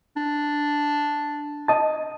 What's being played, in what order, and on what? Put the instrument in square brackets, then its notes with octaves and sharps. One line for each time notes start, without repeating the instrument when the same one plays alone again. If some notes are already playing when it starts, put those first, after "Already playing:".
[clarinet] D4
[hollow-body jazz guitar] D#5 A5